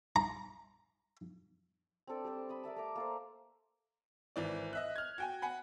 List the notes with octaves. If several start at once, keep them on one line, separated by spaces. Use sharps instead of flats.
A#5
C4 D4 A4 D5
G3 C4 A4 C5
B5 D#6 E6
A#4 D5 E5 A5
A3 A#5 D6
A#3 A4 C5
G#1 E3 D5
D#5 E5 F#6
F6 G#6
F#4 G5 G#5
F#5 G#5 B5